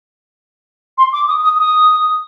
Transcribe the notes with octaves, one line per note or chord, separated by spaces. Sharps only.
C6
D6
D#6
D#6
D#6